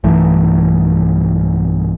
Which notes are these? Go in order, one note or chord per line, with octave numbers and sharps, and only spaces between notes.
B1 G2 E3 A3